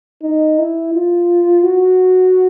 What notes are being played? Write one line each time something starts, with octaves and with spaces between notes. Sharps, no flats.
D#4
E4
F4
F#4